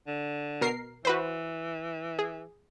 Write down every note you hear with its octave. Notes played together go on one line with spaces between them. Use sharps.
D3
B2 A#4 C7
E3 F#4 B4 C5
G#4